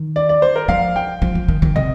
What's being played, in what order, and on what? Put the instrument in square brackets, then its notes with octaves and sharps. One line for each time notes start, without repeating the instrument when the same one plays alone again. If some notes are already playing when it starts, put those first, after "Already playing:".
Already playing: [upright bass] D#3
[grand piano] D5
D5
C5
A#4
[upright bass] F3 [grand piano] F5
[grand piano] G5
[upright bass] F3
F3
D#3
D#3
[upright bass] C3 [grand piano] D#5